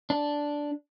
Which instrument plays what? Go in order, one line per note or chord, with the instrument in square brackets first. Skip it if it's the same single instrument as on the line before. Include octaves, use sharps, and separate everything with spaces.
[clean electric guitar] D4